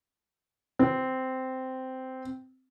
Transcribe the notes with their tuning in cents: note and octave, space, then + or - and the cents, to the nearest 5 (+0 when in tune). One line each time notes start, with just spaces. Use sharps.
C4 -10